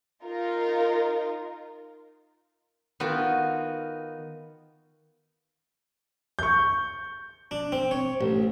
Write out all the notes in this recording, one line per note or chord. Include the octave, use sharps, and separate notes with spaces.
D#4 F4 A#4
D#3 B3 F4 F#4
C#6 G6
D4
C4
C#5
A1